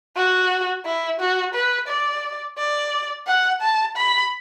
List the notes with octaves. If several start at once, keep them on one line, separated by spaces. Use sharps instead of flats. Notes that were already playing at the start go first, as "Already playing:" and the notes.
F#4
E4
F#4
B4
D5
D5
F#5
A5
B5